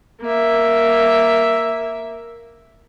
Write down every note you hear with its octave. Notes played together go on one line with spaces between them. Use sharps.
A#3 E5